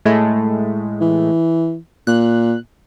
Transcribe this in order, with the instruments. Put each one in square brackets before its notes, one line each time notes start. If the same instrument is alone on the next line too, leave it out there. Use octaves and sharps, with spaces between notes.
[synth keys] A2 G#3 A3
[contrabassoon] E3
[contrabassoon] A#2 [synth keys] F#6